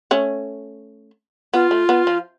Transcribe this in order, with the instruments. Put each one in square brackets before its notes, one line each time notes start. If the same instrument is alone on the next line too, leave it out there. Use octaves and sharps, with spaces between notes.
[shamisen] A3 C#4
[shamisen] B3 [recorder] F4
[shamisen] A3
B3
F3